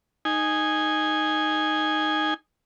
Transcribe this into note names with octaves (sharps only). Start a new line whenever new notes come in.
D#4 G#5